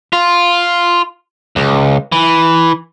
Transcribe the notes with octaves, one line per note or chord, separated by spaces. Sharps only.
F4
C#2
E3